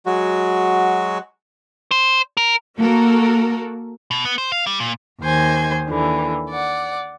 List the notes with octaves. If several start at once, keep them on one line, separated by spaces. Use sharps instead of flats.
F#3 G#3 F#4
C5
A#4
A#3 F#4 A4 A#4
B2
B3
C5
F5
G3
A#2
D#2 D#3 C5 G#5 G#6
D#2 D3 E3
D5 F#5